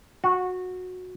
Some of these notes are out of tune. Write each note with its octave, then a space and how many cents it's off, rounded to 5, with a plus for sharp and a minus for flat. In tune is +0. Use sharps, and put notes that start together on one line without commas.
F#4 -15